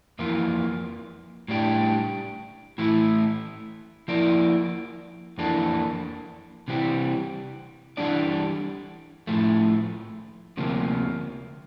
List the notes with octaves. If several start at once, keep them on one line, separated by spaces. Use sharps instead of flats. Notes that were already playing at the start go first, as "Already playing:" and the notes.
F2 E3 A#3 F4
A2 G3 D4 G4
A2 E3 A3 E4
F3 A#3 E4 A#4 D5
F2 E3 A#3 D4 A4
C3 E3 G3 C4
E3 G3 D4 A4 D5
A2 F3 A3
D2 C3 F3 A#3